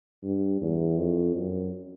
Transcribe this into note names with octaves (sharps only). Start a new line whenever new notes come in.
G2
E2
F2
F#2